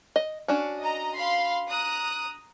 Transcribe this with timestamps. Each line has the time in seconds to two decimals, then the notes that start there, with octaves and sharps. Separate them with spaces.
0.16 D#5
0.48 C#4 D4 F#4
0.79 D#5 A#5
1.15 F5 B5 C6
1.68 A#5 D#6 F#6